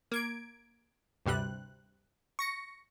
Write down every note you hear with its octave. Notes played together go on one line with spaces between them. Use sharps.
A#3 G#6 D7
D2 G2 C3 G3 F#6
C#6 A#6 C#7